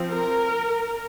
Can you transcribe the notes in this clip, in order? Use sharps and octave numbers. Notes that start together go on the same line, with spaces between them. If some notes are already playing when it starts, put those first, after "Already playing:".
Already playing: F3 C4
A#4